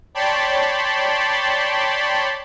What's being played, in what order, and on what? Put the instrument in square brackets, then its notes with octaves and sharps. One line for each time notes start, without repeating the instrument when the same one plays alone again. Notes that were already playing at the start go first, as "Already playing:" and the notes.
[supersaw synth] C#5 D5 G5 A5 B5 C6